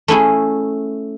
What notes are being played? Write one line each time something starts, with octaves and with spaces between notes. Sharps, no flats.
A3 C#4 E4 G#4